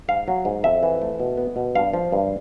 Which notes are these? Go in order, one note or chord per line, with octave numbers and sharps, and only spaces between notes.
G#2 F5
F#3
G#2
F2 E5
E3
A3
B2
B3
B2
G2 F5
F3
G2